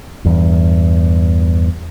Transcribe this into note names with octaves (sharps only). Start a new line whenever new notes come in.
E2 G2